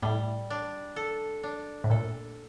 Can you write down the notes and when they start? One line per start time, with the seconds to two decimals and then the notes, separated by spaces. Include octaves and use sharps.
0.02 A2 G3
0.50 D4
0.96 A4
1.43 D4
1.84 A2
1.90 A#2 A4